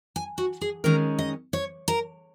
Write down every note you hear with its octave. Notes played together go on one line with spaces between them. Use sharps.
G#5
F#4
G#4
D#3 G#3 C#4 A#4
D#5
C#5
A#4